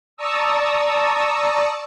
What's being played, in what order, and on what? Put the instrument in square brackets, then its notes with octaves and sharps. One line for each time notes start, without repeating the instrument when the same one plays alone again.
[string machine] D5 A5 A#5 C#6 D#6 E6